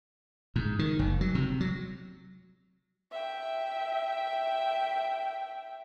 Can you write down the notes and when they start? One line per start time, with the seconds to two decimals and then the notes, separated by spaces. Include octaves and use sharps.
0.56 G#2
0.79 D#3
0.99 F#1
1.21 F#3
1.35 C3
1.61 F#3
3.11 E5 G5